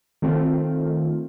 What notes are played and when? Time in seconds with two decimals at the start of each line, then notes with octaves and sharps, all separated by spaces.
0.22 D#3 A3 C4 F4